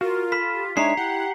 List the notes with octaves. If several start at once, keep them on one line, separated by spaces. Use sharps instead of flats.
F4 F#4 A#4
A4 B5 F6 B6
G4
G#3 D4 D#4 C#5 E5 A#5 C7
E4 G4 F#5